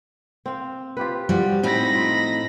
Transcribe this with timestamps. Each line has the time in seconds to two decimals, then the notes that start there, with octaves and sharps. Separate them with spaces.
0.46 C4 F5
0.97 F4 G4 B4
1.29 F3 G3 F#4
1.63 A2 C4 D#4 B5 A#6
1.94 F4